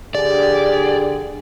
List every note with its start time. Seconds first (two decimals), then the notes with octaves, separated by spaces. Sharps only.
0.15 D3 G4 G#4 D5